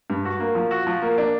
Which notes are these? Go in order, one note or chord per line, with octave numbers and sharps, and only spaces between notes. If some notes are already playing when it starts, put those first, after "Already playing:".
G2
F#4
A#3
F3
F#4
F3
A#3
D4